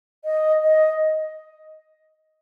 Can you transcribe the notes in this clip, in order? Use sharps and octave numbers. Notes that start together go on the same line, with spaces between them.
D#5
D#5